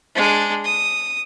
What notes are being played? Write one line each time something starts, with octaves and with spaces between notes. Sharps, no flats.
G#3 D4
D#6